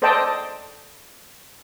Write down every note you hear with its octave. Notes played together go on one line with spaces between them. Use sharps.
A4 C5 D5 D#5 G5 A5